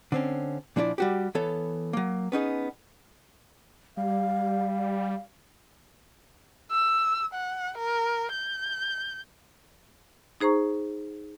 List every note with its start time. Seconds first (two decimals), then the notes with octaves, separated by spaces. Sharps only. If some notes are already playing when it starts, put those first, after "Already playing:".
0.12 D3 C4 C#4
0.76 A#2 F3 D4 E4 B4 D5
0.98 G3 F#4 G4
1.35 E3 B3 A4 C#5
1.93 F#3 A#3
2.32 B3 C#4 D#4 G#4
3.97 G3 F5
6.71 E6
7.34 F#5
7.78 A#4
8.32 G6
10.40 D#4 G#4 C5 A#5 C#6